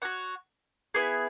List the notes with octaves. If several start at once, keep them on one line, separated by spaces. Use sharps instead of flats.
F#4 C#5 F#5
B3 E4 G#4